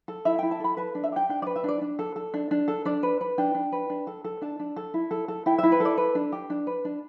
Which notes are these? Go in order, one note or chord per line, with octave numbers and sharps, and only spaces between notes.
A4
E4 E5
G5
E4
A5
A4 B5
B4 A5
D4
E5
G4 G5
D4 G5
D5
B4
E5
D4 D5
D4
A4
A4
D4
D4
A4
D4 D5
B4
B4
D4 G5
D4
B4
D4
A4
A4
D4 A5
D4
A4
E4
A4
A4
E4 G5
E5
E4
B4
A4 D5
B4
D4
G4
D4
B4
D4